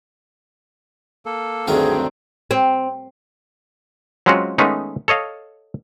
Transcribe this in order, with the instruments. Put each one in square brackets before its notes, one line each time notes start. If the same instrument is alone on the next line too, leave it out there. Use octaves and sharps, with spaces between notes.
[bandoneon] A#3 A4
[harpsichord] D2 D#3 A#4 [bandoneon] G2 [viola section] F#3 C4 D4 [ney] G#4
[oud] C4
[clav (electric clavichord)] F#3 G#3 C4 C#4 F4 F#4
D#3 G#3 A3 B3 C#4 D#4
A4 C#5 D#5 F5